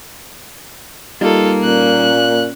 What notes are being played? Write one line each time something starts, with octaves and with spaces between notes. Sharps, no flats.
G3 A#3 D#4 F4 A4
A#2 C#4 F#6